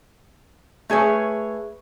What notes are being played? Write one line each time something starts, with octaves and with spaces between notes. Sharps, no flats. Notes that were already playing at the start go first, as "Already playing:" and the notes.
A3 G#4 B4 C#5